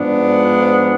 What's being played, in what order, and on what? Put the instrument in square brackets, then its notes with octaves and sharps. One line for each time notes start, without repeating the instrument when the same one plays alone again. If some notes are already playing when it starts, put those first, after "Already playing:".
Already playing: [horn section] G#2 F3 B3 D4